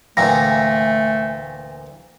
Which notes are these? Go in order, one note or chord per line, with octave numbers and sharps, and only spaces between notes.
D2 A#2 E3 A3 F5 G5 G#5 A#6